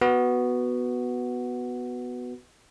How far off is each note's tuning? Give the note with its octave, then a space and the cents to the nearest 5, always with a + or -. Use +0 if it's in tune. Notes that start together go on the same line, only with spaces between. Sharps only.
B3 +0 F#4 +0